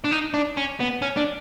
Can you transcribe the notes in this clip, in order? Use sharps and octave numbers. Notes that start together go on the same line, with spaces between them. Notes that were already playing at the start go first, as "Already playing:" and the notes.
D4
D#4
D4
C#4
B3
C#4
D4